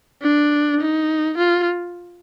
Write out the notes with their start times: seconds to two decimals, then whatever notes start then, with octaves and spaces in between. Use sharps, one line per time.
0.22 D4
0.81 D#4
1.38 F4